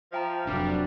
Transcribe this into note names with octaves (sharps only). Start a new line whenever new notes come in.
F3 E5 G5 A#5
F1 F#3 G3 D4